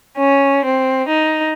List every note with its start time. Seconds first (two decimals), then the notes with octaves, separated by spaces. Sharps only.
0.18 C#4
0.65 C4
1.08 D#4